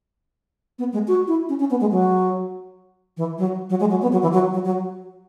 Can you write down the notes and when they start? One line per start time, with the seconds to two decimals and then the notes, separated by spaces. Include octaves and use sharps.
0.79 B3
0.93 G#3
1.08 F#4
1.28 E4
1.49 C#4
1.60 C#4
1.70 B3
1.81 G#3
1.91 F#3
3.17 E3
3.38 F#3
3.70 F#3
3.80 G#3
3.91 F#3
4.02 B3
4.12 F#3
4.22 E3
4.33 F#3
4.53 F#3
4.65 F#3